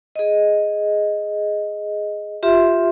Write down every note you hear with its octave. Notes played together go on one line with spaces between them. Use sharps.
G#4 D#5
F4 G4 E5 C6